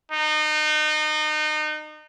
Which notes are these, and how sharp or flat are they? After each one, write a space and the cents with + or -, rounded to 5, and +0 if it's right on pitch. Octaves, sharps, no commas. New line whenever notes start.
D#4 -30